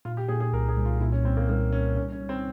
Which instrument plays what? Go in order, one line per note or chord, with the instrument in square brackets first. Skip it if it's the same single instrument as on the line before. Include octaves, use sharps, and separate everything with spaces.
[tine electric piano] A#2 [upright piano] F4
[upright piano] G4
[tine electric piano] A#2 [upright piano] G#4
[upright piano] G#4
[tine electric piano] C2 [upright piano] A#4
[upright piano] G#4
[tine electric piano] C2
[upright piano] F4
[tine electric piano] A#2 [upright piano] E4
[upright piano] C#4
[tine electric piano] C2 [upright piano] C4
[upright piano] A#3
[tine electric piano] G3 [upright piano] A#3
[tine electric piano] G3 [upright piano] C#4
[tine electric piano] C3 [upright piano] C#4
[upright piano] C#4
[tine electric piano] G3
[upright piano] C4